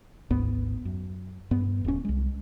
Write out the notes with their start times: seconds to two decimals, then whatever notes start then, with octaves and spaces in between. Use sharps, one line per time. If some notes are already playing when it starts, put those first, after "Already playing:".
0.31 G#1 D2 G#2 B3
0.85 F#2
1.51 G2 B3
1.85 D#1 C#4
2.05 C2 G#3